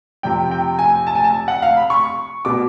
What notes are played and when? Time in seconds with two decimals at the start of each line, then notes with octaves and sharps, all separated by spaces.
0.23 F2 C3 F3 G5
0.51 G5
0.79 G#5
1.07 A5
1.15 G#5
1.24 A5
1.48 F#5
1.62 F5
1.77 B5
1.90 C#6
2.45 B2 D6